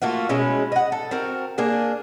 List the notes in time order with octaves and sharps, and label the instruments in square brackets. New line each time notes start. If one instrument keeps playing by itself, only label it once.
[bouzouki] A3 A#3 F4 F#4
B2 G#3 C#4 E4
D#5 F#5
A4
C4 F#4 A#4
A#3 D4 G#4